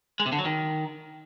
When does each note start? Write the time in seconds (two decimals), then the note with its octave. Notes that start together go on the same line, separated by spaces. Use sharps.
0.20 G#3
0.26 C3
0.32 D3
0.39 F#3
0.45 D#3